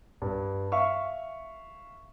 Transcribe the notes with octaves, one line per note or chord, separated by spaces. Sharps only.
G2
E5 F5 C#6